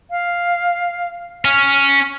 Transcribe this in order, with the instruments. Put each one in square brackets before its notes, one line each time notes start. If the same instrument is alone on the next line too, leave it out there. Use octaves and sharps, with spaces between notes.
[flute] F5
[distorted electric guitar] C#4 [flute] F6